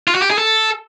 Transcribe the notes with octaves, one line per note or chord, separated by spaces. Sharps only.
F4
F#4
G4
G#4
A4